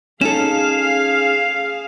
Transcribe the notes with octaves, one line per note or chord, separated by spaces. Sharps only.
C#4 D#4 G#4 A4 F5 E7